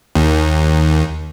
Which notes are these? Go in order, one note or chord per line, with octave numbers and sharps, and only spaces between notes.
D#2